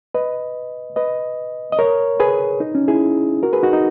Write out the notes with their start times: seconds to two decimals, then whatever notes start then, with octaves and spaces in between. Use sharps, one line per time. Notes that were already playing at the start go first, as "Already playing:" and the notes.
0.14 B4 D#5
0.96 B4 D#5
1.72 D#5
1.79 A#4 C#5
2.20 G#4 B4
2.60 D#4
2.75 C#4
2.88 E4 G#4
3.43 F#4 A#4
3.53 G#4 B4
3.63 D#4 F#4
3.73 D#4